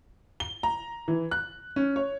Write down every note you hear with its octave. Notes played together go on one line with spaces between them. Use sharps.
G7
A#5
E3
F#6
C#4
C#5